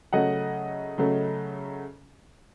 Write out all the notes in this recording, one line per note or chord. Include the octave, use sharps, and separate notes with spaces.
C#3 F#3 A3 D#5 F#5
C#3 F#3 A3